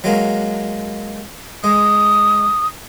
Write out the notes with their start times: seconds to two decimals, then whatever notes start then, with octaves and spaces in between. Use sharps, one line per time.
0.04 F#3 G#3 A#3
1.64 G#3 D#6